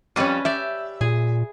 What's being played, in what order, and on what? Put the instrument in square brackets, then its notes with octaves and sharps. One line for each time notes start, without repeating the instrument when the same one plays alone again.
[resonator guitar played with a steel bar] F2 G3 [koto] C#4 B4 D#5
[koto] G4 D5 [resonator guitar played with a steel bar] E5
[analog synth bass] A#2 [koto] G#4